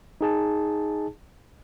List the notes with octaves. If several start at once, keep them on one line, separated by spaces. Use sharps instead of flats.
D#4 G#4 A5